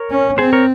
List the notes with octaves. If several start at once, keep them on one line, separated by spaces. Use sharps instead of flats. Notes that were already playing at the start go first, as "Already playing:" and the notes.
Already playing: A#4 C#5
C#4
C4 G#4 C5
A#4 C#5